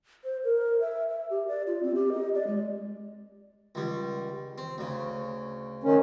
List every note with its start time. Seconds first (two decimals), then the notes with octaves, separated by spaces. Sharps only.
0.24 C5
0.44 A#4
0.81 E5
1.09 E5
1.30 G4
1.48 D5
1.67 F4
1.83 C4
1.95 G4
2.12 D#5
2.35 D5
2.47 G#3
3.75 C#2 G3
4.58 C4
4.78 D2 C#3
5.84 D#3 C#4